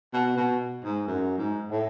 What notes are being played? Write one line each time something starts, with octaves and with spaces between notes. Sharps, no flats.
B2
B2
G#2
F#2
G#2
A2